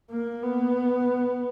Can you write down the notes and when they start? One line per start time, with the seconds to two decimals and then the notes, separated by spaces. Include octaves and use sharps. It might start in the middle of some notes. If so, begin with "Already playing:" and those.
0.11 A#3
0.43 B3